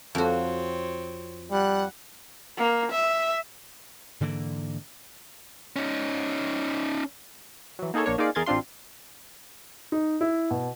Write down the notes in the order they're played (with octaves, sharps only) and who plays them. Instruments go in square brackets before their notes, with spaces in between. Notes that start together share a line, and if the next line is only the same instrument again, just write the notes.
[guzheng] F2 F#4 [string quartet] C4 C#5
[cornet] G3 [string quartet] F#5 F#6
[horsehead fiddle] A#3
E5
[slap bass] G#2 D3 E3 A#3
[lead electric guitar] C#4 D#4
[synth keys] E3 F#3
A#3 D#4 G#4 A4 C#5
A#1 A#3 D4 C#5
A#3 D#4 F4 G#4 D5 F5
E2 G#4 A#4 C6 G#6 A6
A1 C4 D4 F4 C6
[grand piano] D#4
E4
B2